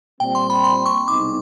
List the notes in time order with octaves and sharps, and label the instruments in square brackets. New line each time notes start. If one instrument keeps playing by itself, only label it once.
[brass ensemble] A#2 G3 C4 [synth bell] G5
[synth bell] C6
B5
C6
C#6
[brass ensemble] C2 B2 G#3 C4 D#4 [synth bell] D6